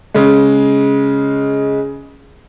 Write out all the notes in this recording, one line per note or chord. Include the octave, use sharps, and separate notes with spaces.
C#3 G#3